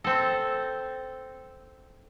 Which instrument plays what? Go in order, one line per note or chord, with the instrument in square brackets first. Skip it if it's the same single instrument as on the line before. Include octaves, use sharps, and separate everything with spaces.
[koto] C4 A4